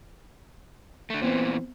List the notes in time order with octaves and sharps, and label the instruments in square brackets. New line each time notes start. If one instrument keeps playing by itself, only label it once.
[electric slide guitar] D3 A3
[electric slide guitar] A#2 E3 [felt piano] B3 C4